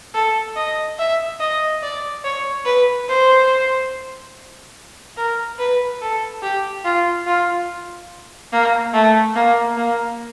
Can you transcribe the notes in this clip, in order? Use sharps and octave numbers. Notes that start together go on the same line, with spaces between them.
A4
D#5
E5
D#5
D5
C#5
B4
C5
A#4
B4
A4
G4
F4
F4
A#3
A3
A#3
A#3